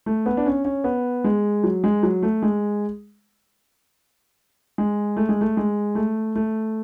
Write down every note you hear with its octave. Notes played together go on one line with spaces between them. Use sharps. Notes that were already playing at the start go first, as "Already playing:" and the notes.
A3
B3
D4
C#4
C#4
B3
G#3
F#3
G#3
F#3
A3
G#3
G#3
A3
G#3
A3
G#3
A3
A3